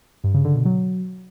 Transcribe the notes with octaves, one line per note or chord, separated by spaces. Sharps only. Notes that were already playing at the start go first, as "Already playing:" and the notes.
G2
C#3
D3
B2
F#3